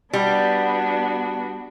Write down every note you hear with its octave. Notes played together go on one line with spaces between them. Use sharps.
G3 B3 D4 F#4